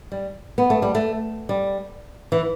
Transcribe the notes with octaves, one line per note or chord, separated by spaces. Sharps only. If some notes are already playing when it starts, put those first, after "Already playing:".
G3
B3
A3
G3
A3
G3
E3